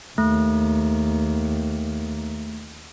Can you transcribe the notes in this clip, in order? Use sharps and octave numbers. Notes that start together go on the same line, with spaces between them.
D#2 A3